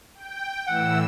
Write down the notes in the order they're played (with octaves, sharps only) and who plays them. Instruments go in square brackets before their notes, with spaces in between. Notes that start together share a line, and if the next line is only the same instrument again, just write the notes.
[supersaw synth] G5
[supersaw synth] A2 E3 E6 [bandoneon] F#5